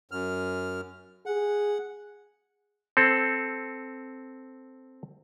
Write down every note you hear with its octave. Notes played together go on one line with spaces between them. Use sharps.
F#2 F6
G#4 F#5
C4 A4